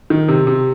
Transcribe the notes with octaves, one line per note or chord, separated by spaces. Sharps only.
D#3
C3
C3